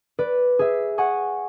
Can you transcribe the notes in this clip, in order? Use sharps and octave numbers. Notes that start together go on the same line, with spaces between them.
B4 D5
G#4 E5
F#5 G#5 C#6 D#6